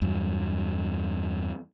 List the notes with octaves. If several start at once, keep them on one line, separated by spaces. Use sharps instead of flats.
E2 G2 F#3